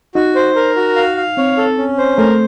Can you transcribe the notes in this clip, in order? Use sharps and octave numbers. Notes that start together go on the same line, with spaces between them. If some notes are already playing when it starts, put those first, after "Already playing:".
D#4 F#4
C5
A#4
F#4
F5
F5
C4 C#5
A4
C#4
C5
A3 A#4